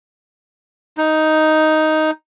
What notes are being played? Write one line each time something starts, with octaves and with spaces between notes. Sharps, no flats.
D#4